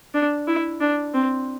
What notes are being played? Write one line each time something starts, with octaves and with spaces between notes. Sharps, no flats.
D4
E4
D4
C4